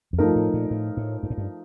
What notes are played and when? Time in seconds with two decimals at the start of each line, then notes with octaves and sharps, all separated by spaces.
0.13 F2
0.18 G2 F3 A3 D#4 A#4
0.36 A2
0.54 A#2
0.71 A2
0.97 A2
1.23 G2
1.30 A2
1.38 G2